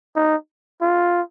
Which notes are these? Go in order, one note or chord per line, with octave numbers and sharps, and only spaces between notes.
D#4
F4